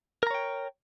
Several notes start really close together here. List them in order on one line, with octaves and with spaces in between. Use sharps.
A#4 A#5 C#5 G5